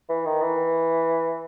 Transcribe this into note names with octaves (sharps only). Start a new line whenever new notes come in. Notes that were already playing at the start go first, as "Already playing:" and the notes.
E3
D#3
E3